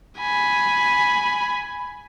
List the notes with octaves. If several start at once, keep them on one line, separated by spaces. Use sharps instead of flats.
G#5 B5